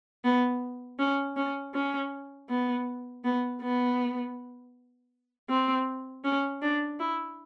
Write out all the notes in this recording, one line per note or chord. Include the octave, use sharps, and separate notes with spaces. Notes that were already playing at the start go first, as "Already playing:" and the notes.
B3
C#4
C#4
C#4
B3
B3
B3
C4
C#4
D4
E4